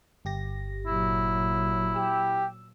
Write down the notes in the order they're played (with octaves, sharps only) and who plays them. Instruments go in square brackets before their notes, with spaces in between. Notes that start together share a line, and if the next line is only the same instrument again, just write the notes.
[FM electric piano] G1 G4 A#6
[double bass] A#2 F#3 [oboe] E4
[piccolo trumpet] G4 [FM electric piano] E6